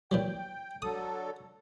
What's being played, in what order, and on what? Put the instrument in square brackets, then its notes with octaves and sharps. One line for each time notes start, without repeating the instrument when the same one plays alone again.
[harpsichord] A#2 E3 F#3 [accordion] G5
[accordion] D3 F#3 A4 [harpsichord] D#6